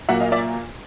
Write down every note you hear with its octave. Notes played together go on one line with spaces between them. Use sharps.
A#2 F#3 A#3 E5 F#5
D#5 F5
D5 E5